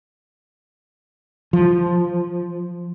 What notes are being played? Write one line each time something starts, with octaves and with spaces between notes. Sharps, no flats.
F3